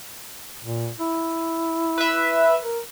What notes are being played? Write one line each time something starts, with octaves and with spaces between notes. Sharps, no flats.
A#2
E4
B4 E5
A#4